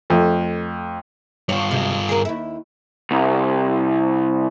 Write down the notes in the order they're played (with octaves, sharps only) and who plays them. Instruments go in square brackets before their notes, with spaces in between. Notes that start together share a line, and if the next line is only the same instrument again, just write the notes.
[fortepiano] F2 A3
[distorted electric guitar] G2 F4 [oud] C#5
[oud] F#2 C3 G#3
G#4 A#4
D#2 E4
[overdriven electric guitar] C2